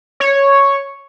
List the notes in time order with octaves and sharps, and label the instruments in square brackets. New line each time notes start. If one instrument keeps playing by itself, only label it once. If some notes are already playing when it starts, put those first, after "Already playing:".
[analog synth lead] C#5